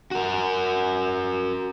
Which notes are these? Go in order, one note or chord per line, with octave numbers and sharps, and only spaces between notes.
F#4 A#4